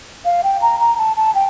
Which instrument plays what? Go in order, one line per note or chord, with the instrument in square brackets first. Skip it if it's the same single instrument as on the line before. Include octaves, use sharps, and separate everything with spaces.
[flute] F5
G5
A#5
A#5
A5
A5
G5